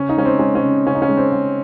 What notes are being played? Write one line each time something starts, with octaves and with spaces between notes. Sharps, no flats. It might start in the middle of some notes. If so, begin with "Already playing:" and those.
Already playing: C#3 C#4
D#4
G#3 C#4
C4
G#3 C#4
C#4
C#3
C#3 C#4
D#4
C#4
G#3
C4
G#3